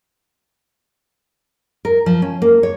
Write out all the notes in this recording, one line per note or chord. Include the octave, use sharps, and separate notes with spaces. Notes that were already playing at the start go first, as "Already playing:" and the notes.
A#4
F3
C#4
A#3
C#5